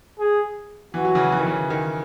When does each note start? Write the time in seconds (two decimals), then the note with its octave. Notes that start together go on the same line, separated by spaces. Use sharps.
0.19 G#4
0.94 E3 F#4
1.05 F#3
1.15 C#3 E3
1.32 E3
1.40 D#3
1.47 C#3 E3
1.70 D#3